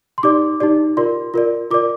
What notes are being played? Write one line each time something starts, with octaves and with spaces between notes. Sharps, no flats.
C6
D#4 G4 D5 D6
D#4 G4 D5
F4 A#4 D5 C6
F4 A#4 D5
F4 A#4 D5 D6